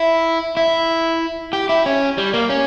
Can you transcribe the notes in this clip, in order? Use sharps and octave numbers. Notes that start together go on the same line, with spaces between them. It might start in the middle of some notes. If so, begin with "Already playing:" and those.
Already playing: E4
E4
G4
E4
C#4
G3
A#3
C#4